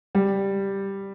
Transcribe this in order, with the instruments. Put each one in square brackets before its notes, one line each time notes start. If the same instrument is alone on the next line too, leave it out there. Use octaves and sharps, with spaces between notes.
[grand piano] G3